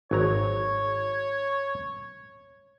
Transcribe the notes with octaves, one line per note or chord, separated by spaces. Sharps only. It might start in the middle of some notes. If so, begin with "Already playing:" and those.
G#1 F#3 C#5 A#5